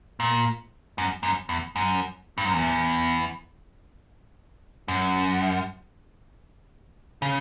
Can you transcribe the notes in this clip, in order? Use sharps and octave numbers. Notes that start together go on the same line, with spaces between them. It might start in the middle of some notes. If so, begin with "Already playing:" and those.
A#2
F#2
F#2
E2
F#2
G2
F#2
E2
F#2
C#3